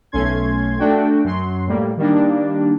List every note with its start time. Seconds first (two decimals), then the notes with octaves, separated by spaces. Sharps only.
0.12 B1 A3 C#4 C6 G#6
0.78 A3 D4 F#4 G5
1.24 F#2 F#3 C6
1.67 A2 G3 A#3
1.97 D#3 G3 A#3 D4